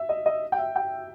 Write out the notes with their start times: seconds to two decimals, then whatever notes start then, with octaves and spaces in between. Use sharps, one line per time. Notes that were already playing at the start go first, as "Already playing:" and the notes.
Already playing: E5
0.09 D#5
0.26 D#5
0.52 G5
0.58 E5
0.76 G5